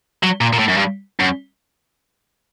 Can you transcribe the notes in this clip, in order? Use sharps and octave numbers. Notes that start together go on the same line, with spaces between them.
F#3
A#2
A#2
A2
F#2
G2
F#2